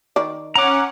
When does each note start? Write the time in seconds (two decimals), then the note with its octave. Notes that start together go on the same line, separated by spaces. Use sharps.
0.16 D#3 D5
0.56 C#4 F#5 A#5 D6